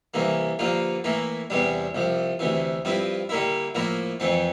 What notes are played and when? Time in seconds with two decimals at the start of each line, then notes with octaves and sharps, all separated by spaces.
0.14 C2 C3 E3 A#3
0.59 G2 D3 F3 A#3 F4
1.04 A2 E3 A#3 E4
1.50 E2 C3 E3 G3 D4
1.95 C2 C3 F3
2.39 D2 C3 E3
2.85 G2 F3 C4 E4
3.29 D3 G3 A#3 E4
3.75 A2 F3 A#3 E4
4.20 F2 E3 A3 C4